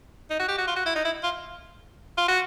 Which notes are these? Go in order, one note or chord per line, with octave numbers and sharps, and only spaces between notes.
D#4
F#4
G4
F#4
F4
F#4
E4
D#4
E4
F4
F4
F#4